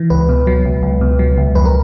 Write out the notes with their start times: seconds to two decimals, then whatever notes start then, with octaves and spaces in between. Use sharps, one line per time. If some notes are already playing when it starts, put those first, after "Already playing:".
Already playing: E3
0.10 C#2 B4
0.29 B2
0.47 F#3
0.65 C#2
0.83 C#2
1.01 B2
1.19 F#3
1.38 C#2
1.55 F2 B4
1.65 A#4